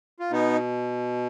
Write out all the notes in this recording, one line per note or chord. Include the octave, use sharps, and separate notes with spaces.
F4
B2 B3 D#4